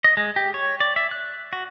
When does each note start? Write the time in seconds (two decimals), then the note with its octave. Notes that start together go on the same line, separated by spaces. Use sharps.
0.04 D#5
0.17 G#3
0.36 G4
0.54 C#5
0.80 D5
0.96 E5
1.11 F#6
1.53 F#4